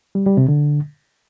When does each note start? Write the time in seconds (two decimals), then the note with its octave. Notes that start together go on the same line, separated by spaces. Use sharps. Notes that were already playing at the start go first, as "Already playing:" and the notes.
0.15 G3
0.26 G3
0.37 C3
0.48 D3